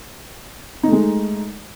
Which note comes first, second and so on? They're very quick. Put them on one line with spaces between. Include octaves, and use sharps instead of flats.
D#4 A3 G#3